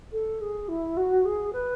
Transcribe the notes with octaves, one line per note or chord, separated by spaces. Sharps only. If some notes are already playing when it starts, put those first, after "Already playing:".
A4
G#4
E4
F#4
G#4
B4